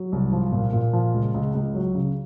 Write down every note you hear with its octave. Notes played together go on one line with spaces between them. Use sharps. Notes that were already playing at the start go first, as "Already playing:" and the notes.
Already playing: F#3
C2
F3
A#2
A#2
F3
C#2
C#2
C#2
F#3
C#3